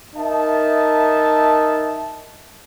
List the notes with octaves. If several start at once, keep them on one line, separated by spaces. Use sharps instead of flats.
D#4 A#4 E5 A5